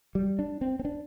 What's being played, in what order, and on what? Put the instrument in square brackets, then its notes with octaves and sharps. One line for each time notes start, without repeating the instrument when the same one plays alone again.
[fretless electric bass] G3
D4
C4
C4
D4